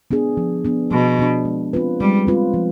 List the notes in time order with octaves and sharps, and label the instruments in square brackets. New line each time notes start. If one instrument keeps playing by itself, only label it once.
[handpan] B3 D4 G#4
F3
B3 D4
[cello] B2 [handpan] F3
[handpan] B3 D4
G#3
C4 F4 B4
[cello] G3 [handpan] G#3
[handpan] C4 F4 B4
F3